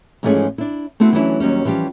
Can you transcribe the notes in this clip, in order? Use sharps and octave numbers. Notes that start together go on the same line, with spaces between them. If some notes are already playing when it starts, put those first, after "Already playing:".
G#2 E3 F3 A3 C#4 G#4
D4 E4
A3 B3 C4 E4 F#4
E3 F#3 A3 C#4 D4 E4
D#2 F#3 G3 C#4
E3 F3 G3 C#4 G4